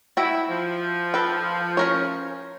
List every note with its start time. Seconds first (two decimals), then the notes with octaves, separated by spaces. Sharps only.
0.17 E4 F#4 G5
0.49 F3
1.14 A4 B4 G5
1.77 C#4 A#4 C#5